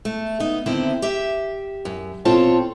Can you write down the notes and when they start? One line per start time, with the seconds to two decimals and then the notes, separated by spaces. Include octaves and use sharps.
0.05 A3
0.40 B3 D#4
0.66 D3 D#3 C4 E4
1.02 G4 E5
1.85 F#2
2.25 B2 C4 F4 A4 C#5 A5